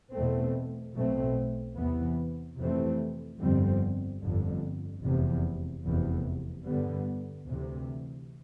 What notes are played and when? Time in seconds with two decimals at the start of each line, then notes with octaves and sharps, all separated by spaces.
0.13 E2 B2 A3 C4
0.95 B1 B2 A3 C4
1.77 E2 C3 E3 B3
2.59 F2 C3 E3 A3 C4
3.40 G1 F2 D3 G3 C4
4.22 G1 F2 D3
5.03 F1 E2 C3
5.86 F1 E2 C3 E3
6.67 G2 D3 G3 B3
7.49 D2 C3 E3